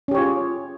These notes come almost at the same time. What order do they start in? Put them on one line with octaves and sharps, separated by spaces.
C#4 G4 C#5 F4 G#4